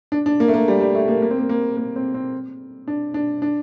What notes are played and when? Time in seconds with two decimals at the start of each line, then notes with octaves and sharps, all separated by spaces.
0.12 D4
0.26 D4
0.40 A#3
0.48 A3
0.54 A#3
0.68 G3
0.80 G3
0.95 A3
1.08 A#3
1.22 A#3
1.31 C4
1.38 A#3
1.49 A#3
1.77 A#3
1.96 C4
2.14 C4
2.88 D4
3.14 D4
3.42 D4